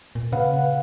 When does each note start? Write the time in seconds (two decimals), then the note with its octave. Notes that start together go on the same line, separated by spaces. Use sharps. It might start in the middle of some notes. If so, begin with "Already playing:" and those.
0.15 A#2
0.32 C#3 B4 F5 F#5